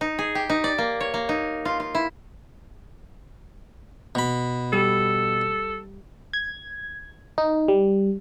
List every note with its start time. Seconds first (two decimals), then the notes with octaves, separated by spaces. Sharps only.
0.01 D#4
0.19 G#4
0.35 G4
0.50 D#4
0.64 D5
0.78 A#3
1.00 C#5
1.14 A#3
1.29 D#4
1.65 F4
1.80 F4
1.95 E4
4.15 B2 B5
4.73 G3 A4
6.33 G#6
7.38 D#4
7.68 G3